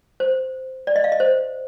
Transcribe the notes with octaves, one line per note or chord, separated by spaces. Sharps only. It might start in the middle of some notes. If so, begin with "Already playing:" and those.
C5
D5
D#5
F5
D#5
C5